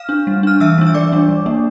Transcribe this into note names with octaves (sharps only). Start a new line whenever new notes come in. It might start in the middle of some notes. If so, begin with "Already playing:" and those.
Already playing: F5 F6
D4
G3
D4 F6
E3 E5 E6
G3 D4
E6
E3 D5 D6
G3 D4
G3
A#3 D4